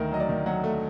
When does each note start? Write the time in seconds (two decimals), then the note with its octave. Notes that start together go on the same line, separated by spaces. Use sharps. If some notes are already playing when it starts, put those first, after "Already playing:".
Already playing: D2 D#3 A#4
0.11 F#3 D#5
0.20 D5
0.29 D#3
0.46 F#3 F#5
0.64 A3